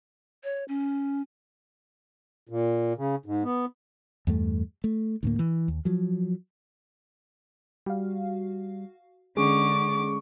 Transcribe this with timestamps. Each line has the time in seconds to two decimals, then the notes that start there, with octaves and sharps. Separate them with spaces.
0.44 C#5
0.68 C#4
2.49 A#2
2.98 C#3
3.26 G#2
3.44 B3
4.27 E2 G2 A3
4.84 A3
5.23 D2 A2 A#3
5.39 E3
5.68 D#2
5.85 F3 F#3
7.86 G3 F#4 F5
9.37 D3 G#3 C#4 G#4 C#6 D6